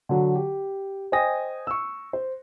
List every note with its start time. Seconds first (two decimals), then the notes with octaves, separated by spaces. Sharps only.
0.09 D3 F#3
0.35 G4
1.12 C5 D#5 G5 G#5 D#6 A#6
1.67 C#6 E6
2.13 C5